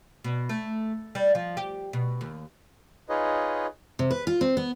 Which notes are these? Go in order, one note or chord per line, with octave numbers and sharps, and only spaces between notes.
B2
A3
G3
F3
G4
B2
D#2
D#4 F4 G#4 B4 C#5 D#5
C3
B4
F4
C4
B3